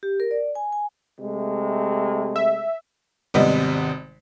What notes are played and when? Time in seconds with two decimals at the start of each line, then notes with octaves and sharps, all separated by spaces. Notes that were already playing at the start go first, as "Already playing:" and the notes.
0.03 G4
0.20 A#4
0.31 D5
0.55 G#5
0.73 G#5
1.20 C3 G#3 A3
2.36 E5
3.34 G#1 C3 G3 B3 D#5